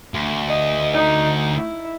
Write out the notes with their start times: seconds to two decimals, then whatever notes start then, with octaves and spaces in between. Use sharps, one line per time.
0.14 D2
0.48 D#5
0.94 D#4
1.56 E4